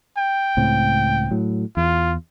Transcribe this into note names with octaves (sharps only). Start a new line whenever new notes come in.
G5
C#2 A2 C4
A2 F#3
E2 F4